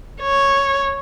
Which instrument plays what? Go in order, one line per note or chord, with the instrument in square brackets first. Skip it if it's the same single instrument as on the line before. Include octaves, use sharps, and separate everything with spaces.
[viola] C#5